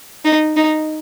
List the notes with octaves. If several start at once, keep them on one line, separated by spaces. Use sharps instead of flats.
D#4
D#4